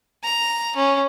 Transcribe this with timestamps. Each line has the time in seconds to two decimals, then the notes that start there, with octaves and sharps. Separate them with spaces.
0.23 A#5
0.76 C#4